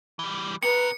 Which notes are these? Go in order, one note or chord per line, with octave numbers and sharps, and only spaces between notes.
E3 G3
C4 A#4 B4 C#7